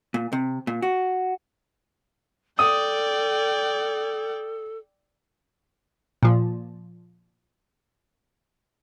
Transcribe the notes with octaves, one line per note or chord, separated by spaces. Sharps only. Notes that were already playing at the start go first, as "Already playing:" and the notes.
A#2
C3
A#2
F#4
A4 D5 G5 D#6
A#2 F3